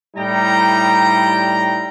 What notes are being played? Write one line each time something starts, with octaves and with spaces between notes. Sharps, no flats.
A2 G3 D#4 E4 G5 A#5